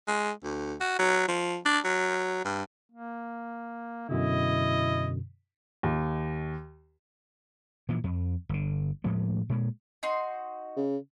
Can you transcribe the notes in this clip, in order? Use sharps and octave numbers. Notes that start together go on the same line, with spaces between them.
G#3
D2
F#4
F#3
F3
D4
F#3
G2
A#3
F#2 B2 D3 E4 D#5
D#2
A#2 E3 F3
F2
G1 D3
A2 F3 G#3 A3
A#2 G#3
D#4 F#4 C6
C#3